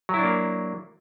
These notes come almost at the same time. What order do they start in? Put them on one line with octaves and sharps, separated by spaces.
F#3 E4 D4 A#3